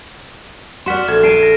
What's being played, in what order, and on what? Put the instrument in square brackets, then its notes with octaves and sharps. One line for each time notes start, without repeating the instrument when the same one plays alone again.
[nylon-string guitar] F#4 D5 [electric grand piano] F#5 C6 [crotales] F6 B6 E7
[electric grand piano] A#1 G#6 [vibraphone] A4
[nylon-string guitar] A5 [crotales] C7 D7 D#7
[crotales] A#6